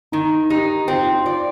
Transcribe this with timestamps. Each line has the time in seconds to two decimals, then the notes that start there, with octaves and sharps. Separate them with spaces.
0.12 D#3 D#4
0.50 D#4 G4
0.88 C4 F4
1.13 F4
1.26 D5